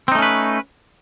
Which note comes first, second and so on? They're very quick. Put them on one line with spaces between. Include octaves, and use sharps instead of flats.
C4 D#4 A3 C#4 B4